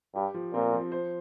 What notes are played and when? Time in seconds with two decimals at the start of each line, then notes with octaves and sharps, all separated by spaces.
0.15 G2 G4
0.34 F3
0.54 A#2 C4
0.73 F3
0.92 C5